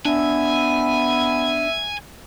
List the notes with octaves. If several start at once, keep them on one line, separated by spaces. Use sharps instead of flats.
B3 D4 E5 G#5